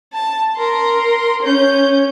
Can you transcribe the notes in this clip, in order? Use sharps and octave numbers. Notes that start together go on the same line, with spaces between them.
A5
A#4 C6
C#4 G6